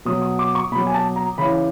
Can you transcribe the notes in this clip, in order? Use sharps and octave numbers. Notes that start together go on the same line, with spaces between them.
B2 F#3 D#6
D#6
D6
C#6
B2 F#3 B5
G#5
A5
A#5
C#3 E3 B5